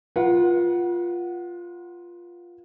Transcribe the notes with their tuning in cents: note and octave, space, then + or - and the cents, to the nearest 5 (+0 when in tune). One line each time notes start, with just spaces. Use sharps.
F4 +0 B4 -40 F#5 +0